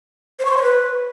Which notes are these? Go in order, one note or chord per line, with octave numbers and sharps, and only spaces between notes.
C5
C#6
C6
C#5
B4